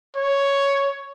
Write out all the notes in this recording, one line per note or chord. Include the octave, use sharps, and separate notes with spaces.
C#5